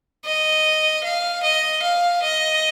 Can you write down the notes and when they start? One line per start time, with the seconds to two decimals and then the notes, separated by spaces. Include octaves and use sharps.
0.25 D#5
1.04 F5
1.43 D#5
1.83 F5
2.22 D#5